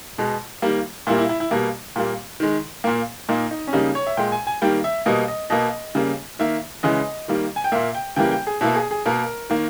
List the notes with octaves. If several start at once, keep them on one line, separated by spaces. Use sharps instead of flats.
B2 G#3
D#3 G3 A#3
A#2 G3 A#3 E4
E4
E4
E4
B2 G3 A#3
A#2 G3 A#3
D#3 G#3
A#2 A#3
A#2 A#3 D#4
D#4
C#4
C#3 G3 A#3 D#4
C#5
E5
A#2 G#3 G5
G#5
G#5
D#3 G3 A#3 G5
E5
B2 G3 A#3 D#5
D#5
B2 A#3 D#5
C#3 G3 A#3
D#3 A#3 E5
C#3 E3 G#3 D#5
D#3 G3 A#3
G#5
G5
A#2 A#3 E5
G5
C#3 E3 G3 A#3 G5
G5
G#4
B2 A#3 E4
G#4
G#4
B2 A#3 A#4
D#3 A#3